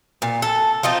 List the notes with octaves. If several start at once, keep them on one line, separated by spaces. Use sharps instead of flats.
A#2
A4
F3 C4 D#4 F4